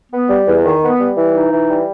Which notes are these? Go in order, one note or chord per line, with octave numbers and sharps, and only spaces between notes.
B3
G3
E2
D#3
B3
G3
E3
D#4
E3
G3